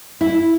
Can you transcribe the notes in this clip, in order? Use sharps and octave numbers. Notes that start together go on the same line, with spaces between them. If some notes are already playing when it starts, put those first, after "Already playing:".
E4